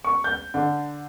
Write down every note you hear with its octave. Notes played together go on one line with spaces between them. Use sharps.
C#6
G6
D3